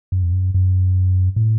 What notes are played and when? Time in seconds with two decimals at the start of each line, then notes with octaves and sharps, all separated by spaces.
0.12 F#2
0.23 F2
0.32 F#2
0.54 F#2
1.36 A2